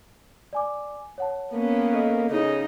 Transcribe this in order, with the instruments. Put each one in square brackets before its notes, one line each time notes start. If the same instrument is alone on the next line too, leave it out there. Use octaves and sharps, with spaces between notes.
[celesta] D5 G#5 D6
C#5 F#5 A5
[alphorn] A#3 [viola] B3 C#4
[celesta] A4 A#4 D#5
[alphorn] C#3 [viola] D#4